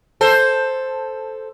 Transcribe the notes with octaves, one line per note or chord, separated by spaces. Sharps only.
A4 C5